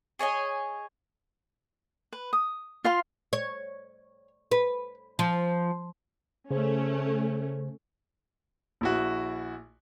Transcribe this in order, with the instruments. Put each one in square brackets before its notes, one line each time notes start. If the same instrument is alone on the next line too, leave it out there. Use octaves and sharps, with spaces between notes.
[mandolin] G#4 C#5 D#5 G#5
[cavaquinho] B4
D#6
F4 F5 C6
[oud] C#5
B4
F3
[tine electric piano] C#3 C5 [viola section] A3 C#4
[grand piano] A#1 E4 F#4